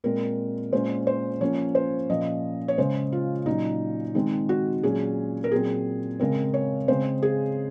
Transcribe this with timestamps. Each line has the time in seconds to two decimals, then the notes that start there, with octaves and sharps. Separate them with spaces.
0.04 A#2 G#3 C4 A#4
0.73 A#2 G#3 C#4 C5
1.07 C5
1.41 F3 A#3 C#4 C#5
1.75 C5
2.10 A#2 F3 A#3 C#4 D#5
2.68 C#5
2.78 C#3 G#3 C#4 C5
3.12 F4
3.46 A#2 F#3 C#4 D#4
4.15 D#3 G#3 C4
4.49 F#4
4.83 A#2 F#3 C#4 G#4
5.44 A#4
5.52 A#2 F#3 C4 G#4
6.19 C#3 G#3 C4 A#4
6.54 C#5
6.88 C#3 G#3 C4 C5
7.23 G#4